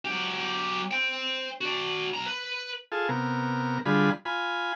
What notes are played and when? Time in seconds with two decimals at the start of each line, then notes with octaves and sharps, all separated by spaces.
0.05 F#3 G4
0.91 C5 G5
1.61 F#4 D5
2.14 B1 A#5
2.26 B4
2.92 F4 G#4 A4
3.09 C3 B3 A#4
3.86 D3 G3 F4 G#4 B5
4.25 F4 G#5 B5